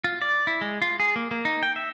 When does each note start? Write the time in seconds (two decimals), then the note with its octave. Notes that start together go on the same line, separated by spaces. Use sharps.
0.04 F4
0.22 D5
0.47 E4
0.61 G#3
0.82 F4
1.00 G#4
1.16 A#3
1.31 A#3
1.45 D#4
1.63 G5
1.76 E5